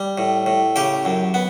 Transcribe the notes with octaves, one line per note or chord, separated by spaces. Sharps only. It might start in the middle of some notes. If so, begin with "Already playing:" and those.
Already playing: G3
A2
A2
C#3 G4 G5
F#2
B3